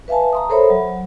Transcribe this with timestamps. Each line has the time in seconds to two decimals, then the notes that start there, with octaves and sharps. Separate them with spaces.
0.08 B4 E5 F5 G#5 A5
0.33 A#5 C6 D#6
0.49 A4 A#4 C5 C#5 E5 B5
0.70 F#3